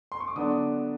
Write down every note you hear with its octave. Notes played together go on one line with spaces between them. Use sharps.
C6
C#6
D6
D3 F#3 B3 D4 D#6